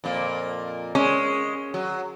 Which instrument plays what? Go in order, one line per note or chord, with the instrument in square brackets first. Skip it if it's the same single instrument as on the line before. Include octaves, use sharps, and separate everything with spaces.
[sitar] F2 A#2 A#3
[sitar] G#3 [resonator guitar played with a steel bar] C#4
[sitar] F#3